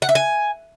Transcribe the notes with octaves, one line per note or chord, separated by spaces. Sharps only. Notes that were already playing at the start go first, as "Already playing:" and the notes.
F#5
E5
G#5